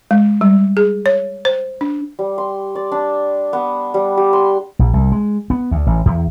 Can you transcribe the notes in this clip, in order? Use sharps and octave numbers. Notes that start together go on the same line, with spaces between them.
G#3
G3
G#4
C#5
C5
D4
G3
C6
D5
D4
B3
G3
G4
C6
A#1
C2
G#3
B3
D2
A1
E2